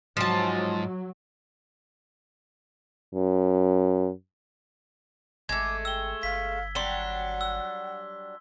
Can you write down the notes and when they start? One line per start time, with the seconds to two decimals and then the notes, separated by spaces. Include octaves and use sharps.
0.17 G#2 F3 F#3 A5
3.14 F#2
5.49 G#1 G#3 A3 D6 G#6
5.85 G5 E6 G7
6.23 G1 F5 B6
6.75 F#3 G3 D4 F#5 C6 G7
7.41 E6